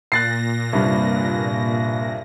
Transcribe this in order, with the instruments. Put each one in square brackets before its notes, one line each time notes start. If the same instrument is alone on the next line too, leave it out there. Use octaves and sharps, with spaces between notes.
[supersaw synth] A#2 A#6 [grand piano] F#6 A6 C7
[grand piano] C2 G2